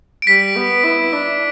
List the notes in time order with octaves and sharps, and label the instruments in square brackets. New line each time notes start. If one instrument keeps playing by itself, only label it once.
[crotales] D7
[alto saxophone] G3 [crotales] B6
[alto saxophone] B3
E4
D4